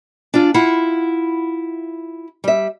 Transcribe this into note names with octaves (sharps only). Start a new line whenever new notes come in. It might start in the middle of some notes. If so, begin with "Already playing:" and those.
D4 F4
E4 F4 F#5
G3 E5